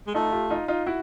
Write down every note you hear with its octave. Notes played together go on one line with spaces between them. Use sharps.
G#3
A3 D#4 F4
F4 G4
D#4 F4
D#4 F4
E4 F#4